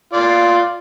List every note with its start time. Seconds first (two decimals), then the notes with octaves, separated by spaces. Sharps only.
0.13 F4 D5